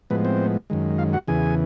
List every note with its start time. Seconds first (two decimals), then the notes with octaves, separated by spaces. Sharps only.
0.10 A2 F3 G#3 B3 B4
0.25 C4 C5
0.70 F#2 D#3 G#3
0.98 F4 F5
1.13 F#4 F#5
1.28 E2 C#3 E3 G#4 G#5